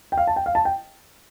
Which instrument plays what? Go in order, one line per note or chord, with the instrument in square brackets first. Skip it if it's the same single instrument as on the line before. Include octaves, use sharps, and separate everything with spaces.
[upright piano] G5
F5
A5
G5
F5
A5
G5